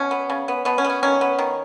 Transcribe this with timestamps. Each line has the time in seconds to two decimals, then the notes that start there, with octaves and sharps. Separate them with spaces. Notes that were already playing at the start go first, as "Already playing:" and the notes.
Already playing: B2 C#4
0.11 B3
0.30 C#3
0.48 B3
0.65 B2 B3
0.78 C#4
0.84 B3
0.90 C#4
1.03 D#3 C#4
1.21 B3
1.39 D#3